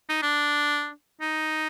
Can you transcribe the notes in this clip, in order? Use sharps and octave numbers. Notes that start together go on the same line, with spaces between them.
D#4
D4
D#4